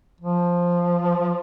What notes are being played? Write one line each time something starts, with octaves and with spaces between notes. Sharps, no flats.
F3